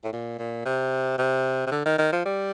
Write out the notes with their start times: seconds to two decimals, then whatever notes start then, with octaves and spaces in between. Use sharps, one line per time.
0.04 A2
0.13 A#2
0.39 A#2
0.65 C3
1.18 C3
1.67 C3
1.71 D3
1.86 D#3
1.99 D#3
2.12 F3
2.25 G3